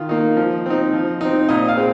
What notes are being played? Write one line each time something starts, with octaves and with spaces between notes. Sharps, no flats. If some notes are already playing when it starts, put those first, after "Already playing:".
Already playing: D#3 F4
A#3 D#4
F3
C4 D#4
F3
C4 D#4
A#2 D#5
F5
G#3 C4